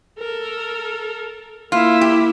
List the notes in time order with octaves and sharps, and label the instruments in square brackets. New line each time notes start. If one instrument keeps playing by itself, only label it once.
[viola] A4 A#4
[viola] A#3 E4 [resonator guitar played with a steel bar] F4
[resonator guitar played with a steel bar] G4